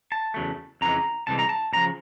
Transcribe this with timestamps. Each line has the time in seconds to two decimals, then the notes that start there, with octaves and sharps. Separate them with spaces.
0.12 A5
0.34 E2 C#3 F#3 A3
0.81 F2 C#3 E3 G#3 B3 A#5
1.27 C2 C3 E3 G#3 A5
1.39 A#5
1.49 A5
1.73 C#2 C#3 F3 A#5